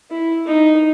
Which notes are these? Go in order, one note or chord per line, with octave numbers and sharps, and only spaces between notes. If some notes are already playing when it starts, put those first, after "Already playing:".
E4
D#4